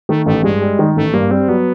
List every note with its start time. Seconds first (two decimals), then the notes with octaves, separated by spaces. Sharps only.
0.09 D#3 A3
0.26 A1 A3
0.43 G2 G#3
0.62 G3
0.79 D#3
0.96 A1 A3
1.13 G2 A#3
1.31 G3 C4
1.48 F#3 B3